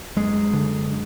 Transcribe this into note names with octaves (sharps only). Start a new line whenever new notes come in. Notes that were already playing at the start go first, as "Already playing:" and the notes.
F#2 G#3
D3